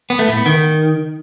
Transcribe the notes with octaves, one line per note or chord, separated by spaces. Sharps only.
B3
A3
A2
B3
D#3